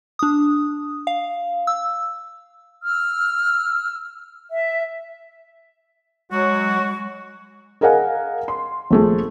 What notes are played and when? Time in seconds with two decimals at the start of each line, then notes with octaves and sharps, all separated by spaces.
0.19 D4 D#6
1.07 F5
1.67 E6
2.82 E6 F6
4.50 E5
6.32 F#3 G#3 F#4 C#6
7.81 G#4 A#4 D#5 F5 F#5 G#5
8.48 C6
8.91 A#1 A3 G#4